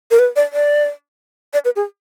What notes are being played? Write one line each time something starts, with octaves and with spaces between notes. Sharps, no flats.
A#4
B4
D5
D5
D5
B4
G#4